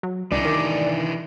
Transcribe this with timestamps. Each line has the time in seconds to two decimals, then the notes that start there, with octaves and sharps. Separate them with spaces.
0.03 F#3
0.32 C#2 E3 D4 D#4 D5
0.45 D#3